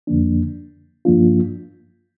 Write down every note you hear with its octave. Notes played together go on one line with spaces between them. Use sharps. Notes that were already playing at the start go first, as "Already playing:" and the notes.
F2 D3 F3 A#3 D4
G2 F3 A#3 D4 F4